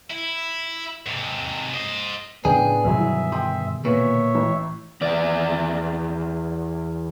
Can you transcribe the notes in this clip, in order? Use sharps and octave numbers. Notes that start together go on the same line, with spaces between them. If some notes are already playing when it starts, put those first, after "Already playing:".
E4
G#2 C3
C5 D#5
A2 C#3 F3 B3 D4 G#4 G5
G2 B2 D3 D#3 F#3 E4 E5
G5 C6 D#6
A#2 B3 C#5 E5
A1
E2 D5